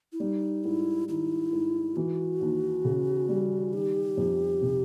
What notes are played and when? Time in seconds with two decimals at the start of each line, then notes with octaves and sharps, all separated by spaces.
0.13 E4
0.20 G3 D#4
0.64 G#2 E4
1.08 D#3 E4
1.53 G#2
1.96 E3 F#4
2.41 D#2
2.84 C#3
3.29 G3
3.73 D#3 G4
4.17 F2
4.62 C3